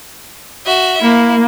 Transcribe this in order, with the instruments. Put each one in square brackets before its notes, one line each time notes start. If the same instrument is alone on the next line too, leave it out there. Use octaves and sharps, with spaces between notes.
[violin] F#4 E5
[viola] A#3 [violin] E4